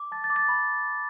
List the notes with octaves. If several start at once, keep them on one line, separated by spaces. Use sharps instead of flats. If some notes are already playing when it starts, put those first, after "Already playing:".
Already playing: D6
A5 A6
A6
D6
A6
B5